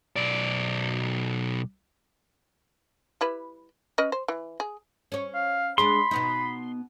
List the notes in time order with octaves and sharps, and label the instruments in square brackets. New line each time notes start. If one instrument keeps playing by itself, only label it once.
[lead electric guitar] B1 D5
[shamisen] G3 E4 B4
C#4 B4 D#5
C5
E3
G#4
[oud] C#4 C#5
[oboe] F5
[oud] G#3 D4 G#4 [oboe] B5 [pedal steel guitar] C6
[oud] B2 B3 D#4